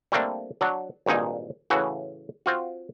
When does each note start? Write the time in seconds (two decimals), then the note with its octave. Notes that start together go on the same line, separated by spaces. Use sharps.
0.12 G3 A3 A#3 C4 D4
0.61 F#3 D4 F#4
1.06 G#1 G2 A#2 D#4 G#5
1.70 A2 C#3 E3 F#4
2.46 C4 F4 F#4